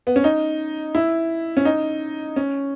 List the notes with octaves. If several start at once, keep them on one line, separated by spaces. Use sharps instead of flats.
B3
C#4
D#4
E4
C#4
D#4
C#4